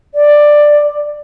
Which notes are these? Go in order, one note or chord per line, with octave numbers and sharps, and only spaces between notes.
D5